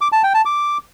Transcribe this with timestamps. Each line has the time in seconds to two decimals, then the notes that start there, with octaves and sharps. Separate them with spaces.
0.01 D6
0.12 A5
0.23 G5
0.34 A5
0.45 D6